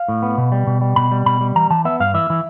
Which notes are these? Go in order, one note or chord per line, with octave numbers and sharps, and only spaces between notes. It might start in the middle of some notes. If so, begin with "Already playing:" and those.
Already playing: F5
A2
B3
B2
G3
B2
G3
B2 B5
G3
B2 B5
G3
E3 A#5
E3 A5
B3 E5
G2 F5
E3 E5
E3